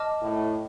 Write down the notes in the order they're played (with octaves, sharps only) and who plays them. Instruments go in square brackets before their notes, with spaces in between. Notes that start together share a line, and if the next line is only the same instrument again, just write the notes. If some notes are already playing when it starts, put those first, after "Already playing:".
Already playing: [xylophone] D#5 A5 D6 F6
[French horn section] A2